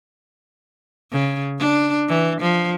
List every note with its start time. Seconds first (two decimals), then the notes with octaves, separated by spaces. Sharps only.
1.12 C#3
1.59 D4
2.09 E3
2.41 F3